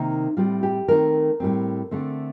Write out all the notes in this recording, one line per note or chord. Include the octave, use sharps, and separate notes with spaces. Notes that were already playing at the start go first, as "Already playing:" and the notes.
Already playing: C3 D#3 A#3 D#4
A2 G3 C4 F4
G4
D#3 A3 C4 A#4
A2 G3 C4
D3 A3 C4